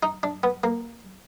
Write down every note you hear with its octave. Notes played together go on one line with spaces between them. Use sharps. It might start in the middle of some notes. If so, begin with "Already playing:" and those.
D#4
D4
B3
A#3